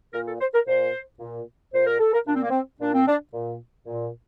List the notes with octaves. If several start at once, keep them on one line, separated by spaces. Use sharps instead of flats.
A#2 A#4
A4
C5
A#4
A#2 C5
A#2
A#2 C5
A#4
A4
A#4
A#2 D4
C4
A#3
C4
A#2 D4
C4
D4
A#2
A#2